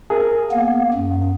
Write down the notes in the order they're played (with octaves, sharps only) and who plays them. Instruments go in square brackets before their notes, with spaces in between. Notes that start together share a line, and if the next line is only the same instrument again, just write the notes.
[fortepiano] G#4 A#4
[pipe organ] A#3 B3
F#2